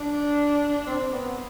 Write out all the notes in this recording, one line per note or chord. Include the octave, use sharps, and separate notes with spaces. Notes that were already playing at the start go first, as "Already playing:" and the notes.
Already playing: D4
C4
B3